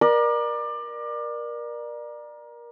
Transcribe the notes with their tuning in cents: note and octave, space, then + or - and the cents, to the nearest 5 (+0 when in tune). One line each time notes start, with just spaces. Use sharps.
A#4 +25 D5 +25